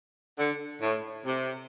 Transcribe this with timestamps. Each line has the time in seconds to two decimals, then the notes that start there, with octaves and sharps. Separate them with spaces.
0.38 D3
0.82 A2
1.25 C3